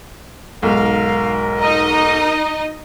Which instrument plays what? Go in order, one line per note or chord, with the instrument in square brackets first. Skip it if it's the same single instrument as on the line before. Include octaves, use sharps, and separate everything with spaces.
[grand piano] B1 G#2 [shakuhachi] A#4 [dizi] F5
[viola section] D#4 D#5 [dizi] A#5